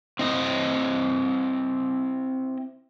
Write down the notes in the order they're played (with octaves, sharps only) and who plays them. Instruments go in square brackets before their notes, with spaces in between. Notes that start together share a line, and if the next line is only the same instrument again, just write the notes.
[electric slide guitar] C4 E4 D#5